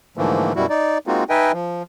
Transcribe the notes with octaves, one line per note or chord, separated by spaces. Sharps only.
G#2 D3 E3 F3 A3 A#3
F#2 B2 G3 E4 F#4
D#4 D5
G#3 A#3 C4 D#4 F4 F#4
D#4 B4 D#5 E5 G5 G#5
F3